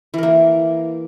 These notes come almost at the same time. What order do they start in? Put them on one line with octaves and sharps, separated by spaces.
E3 A#4 A#3